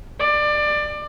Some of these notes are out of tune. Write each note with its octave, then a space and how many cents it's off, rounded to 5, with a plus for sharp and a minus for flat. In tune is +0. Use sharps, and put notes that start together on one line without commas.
D5 +20